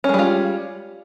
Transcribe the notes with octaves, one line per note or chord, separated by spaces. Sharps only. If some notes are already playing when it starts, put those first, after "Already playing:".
G3 G#3 C#4 F4